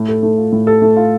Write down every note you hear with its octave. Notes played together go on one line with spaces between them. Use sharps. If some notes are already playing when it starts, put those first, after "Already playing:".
Already playing: A2
A4
A3
F4
A2
A4
A3
F4